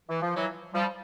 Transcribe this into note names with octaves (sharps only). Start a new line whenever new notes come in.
E3
F3
E3 F#3
F3 G3